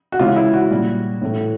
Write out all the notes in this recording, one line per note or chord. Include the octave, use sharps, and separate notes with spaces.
F#4
C#3 E3 G#3 F4
E4
F#4
A#2 G3
A2 E3 A3